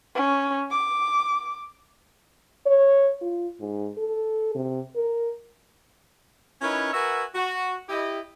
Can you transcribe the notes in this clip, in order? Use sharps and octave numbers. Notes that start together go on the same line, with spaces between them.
C#4
D6
C#5
F4
G#2
A4
C3
A#4
C#4 D#4 E4 A#4 B4 C#5
F#4 A#4 B4 E5 F#5 G#5
F#4
E4 G4 D#5